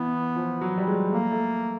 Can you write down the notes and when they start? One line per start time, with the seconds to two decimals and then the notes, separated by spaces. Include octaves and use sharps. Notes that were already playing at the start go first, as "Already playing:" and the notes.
Already playing: E3 B3
0.36 F3
0.61 F#3
0.78 G3
0.87 G#3
1.12 A3 A#3
1.31 A3